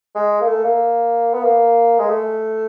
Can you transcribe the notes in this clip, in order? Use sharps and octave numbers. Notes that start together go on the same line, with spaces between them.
G#3
A#3
A3
A#3
B3
A#3
G#3
A3